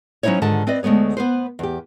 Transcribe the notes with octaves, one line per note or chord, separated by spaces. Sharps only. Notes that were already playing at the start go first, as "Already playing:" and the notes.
F#3 C#4 D#4 E4 C5 C#5
G#2 D3 D#3 F4 A4 A5
C4 B4 D5 D#5
D2 G#3 A3 B3 C#5
B3 B4 C5
E2 G4